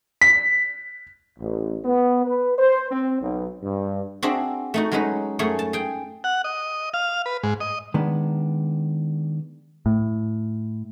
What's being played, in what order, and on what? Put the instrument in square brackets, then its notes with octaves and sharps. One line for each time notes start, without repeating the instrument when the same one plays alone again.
[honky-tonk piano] B6
[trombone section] A1
B3
B4
C5
C4
B1
G2
[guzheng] C4 D4 F#4 G#4 E5
A3 D#4 F#4
F#3 G#3 C#4 D#4 B4
F#2 A3 G#4 C#5
A5
G#4 G5
[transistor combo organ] F#5
D#5
F5
B4
G#2
D#5
[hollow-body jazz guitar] D#3 G#3 B3 D4
[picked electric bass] A2